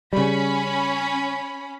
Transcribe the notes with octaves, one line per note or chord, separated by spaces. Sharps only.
C#3 G3 C#4 B5